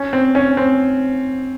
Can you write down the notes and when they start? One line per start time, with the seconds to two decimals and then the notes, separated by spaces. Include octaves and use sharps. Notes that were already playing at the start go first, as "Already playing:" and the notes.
Already playing: C#4
0.13 C4
0.35 C#4
0.57 C4